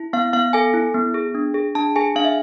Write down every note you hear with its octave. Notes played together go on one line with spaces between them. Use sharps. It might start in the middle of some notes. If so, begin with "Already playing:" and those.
Already playing: E4
B3 F5
B3 F5
A4 G#5
E4
B3
G#4
D4
G#4
D4 A5
G#4 G#5
D4 F5
E5